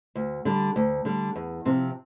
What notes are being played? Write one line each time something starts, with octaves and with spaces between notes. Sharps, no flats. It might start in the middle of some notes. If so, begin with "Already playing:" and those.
D2
D3 G3
D2
D3 G3
E2
C3 F3 C4